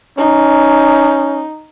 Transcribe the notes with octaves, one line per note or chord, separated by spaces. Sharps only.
C#4 D#4